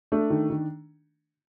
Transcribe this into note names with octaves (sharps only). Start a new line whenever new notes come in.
A3 D4
D#3
D#3